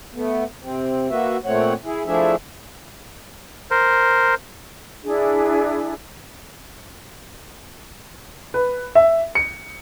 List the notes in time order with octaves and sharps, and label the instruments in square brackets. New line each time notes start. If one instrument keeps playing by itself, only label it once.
[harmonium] A3 B3
C3 C4
A#3 F#4 B4 E5
A#2 A3 C4 C#5 F#5
E4 G#4
F3 A3 D4 E4 G#4 E5
[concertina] A#4 C5
[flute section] D4 E4 G#4
[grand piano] B4
E5
C#7